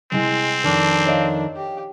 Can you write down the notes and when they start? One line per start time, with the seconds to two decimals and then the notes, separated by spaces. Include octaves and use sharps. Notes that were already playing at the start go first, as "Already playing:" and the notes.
0.12 C2 G#3 C4
0.64 F2 D#3 D4
1.05 C#5 D#5 F5
1.56 G4